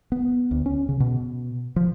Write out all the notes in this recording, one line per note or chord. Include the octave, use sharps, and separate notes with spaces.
B3
D2
C#4
C#3
B2
F3